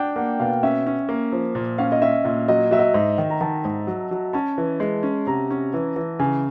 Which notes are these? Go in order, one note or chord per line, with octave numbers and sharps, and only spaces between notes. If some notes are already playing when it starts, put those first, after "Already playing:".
Already playing: D4 G5
A#3 F#5
B2 F5
C#4 E5
C#4
A#3
F3
A#2
C#4 F5
D#5
C#4 E5
A#2 E5
F#3 D#5
F#3 E5
D#5
G#2
D#3
A#5
D#3 A5
G#2
F#3
F#3
C#4 A5
E3
G#3
C#4
C3 A#5
C#4
E3
E3
C#3 G#5